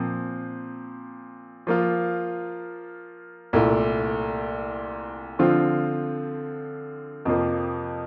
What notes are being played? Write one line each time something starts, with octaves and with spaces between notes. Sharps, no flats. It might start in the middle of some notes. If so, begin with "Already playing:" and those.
Already playing: A#2 F3 C4
F3 A#3 F4
C2 A#2 A3 E4
D3 F3 C4 F4
F2 C3 F3 A#3